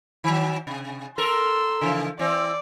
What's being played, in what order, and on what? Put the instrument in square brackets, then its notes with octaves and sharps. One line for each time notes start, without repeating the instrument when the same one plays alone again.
[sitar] D#3 F#3
C3
[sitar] A4 A#4 [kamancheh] C6 E6
[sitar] C#3 E3 F3
[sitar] E3 C4 [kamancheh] D5